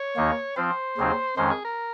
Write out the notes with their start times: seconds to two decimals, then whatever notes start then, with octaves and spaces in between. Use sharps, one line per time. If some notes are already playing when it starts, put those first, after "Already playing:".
Already playing: C#5
0.17 D#2 D#3 A#3 D#4
0.56 F3 C4 F4 C5
0.97 D#2 C#3 F#3 C4 D#4
1.37 F2 D#3 G#3 C#4 C5
1.51 G#4
1.65 A#4